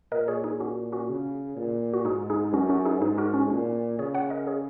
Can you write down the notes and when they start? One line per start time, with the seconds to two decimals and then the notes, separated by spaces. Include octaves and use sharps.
0.12 A#2 A#4 D#5
0.28 G#4 C#5
0.44 D#4 G#4
0.60 C#4 F#4
0.92 C#4 F#4
1.09 C#3
1.57 A#2
1.94 F#4
2.05 G#2 D#4 G#4
2.30 D#4 G#4
2.54 F#2 C#4 F#4
2.69 C#4 F#4
2.85 D#4 G#4
3.01 G#2 D#4 G#4
3.18 F#4 A#4
3.34 C#4 F#4
3.50 A#2 C#4
3.99 C#3 G#4 C#5
4.15 C#5 F#5
4.30 A#4 D#5
4.47 G#4 C#5